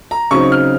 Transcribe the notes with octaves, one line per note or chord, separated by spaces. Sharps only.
A#5
C#3 F#3 C4 D#4 C#6
F6